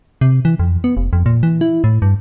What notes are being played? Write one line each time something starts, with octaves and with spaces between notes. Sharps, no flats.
C3
E3
F2
B3
F1
F2
A#2
E3
E4
A2
G2